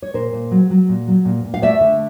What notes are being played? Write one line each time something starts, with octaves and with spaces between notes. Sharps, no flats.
C#5
A#2 A#4 C5
A#2
F#3
F#3
A#2
F#3
A#2
A#2
F5
A3 D5 E5
D3